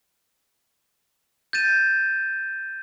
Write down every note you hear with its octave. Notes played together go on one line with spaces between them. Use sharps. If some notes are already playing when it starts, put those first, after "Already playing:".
G6 A6 D#7 E7